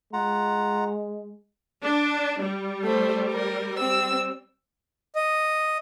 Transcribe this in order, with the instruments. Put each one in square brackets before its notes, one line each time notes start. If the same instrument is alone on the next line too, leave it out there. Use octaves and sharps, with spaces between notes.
[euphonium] G#3 [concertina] F4 F#5 A#5
[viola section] D4
G3
[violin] A3 C5
A#4
C4 E6
[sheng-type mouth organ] D#5